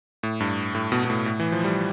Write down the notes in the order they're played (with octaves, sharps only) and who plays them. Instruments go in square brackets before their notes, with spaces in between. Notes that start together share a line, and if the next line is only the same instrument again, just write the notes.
[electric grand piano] A2
G2
A2
B2
B2
A2
A2
E3
F3
G3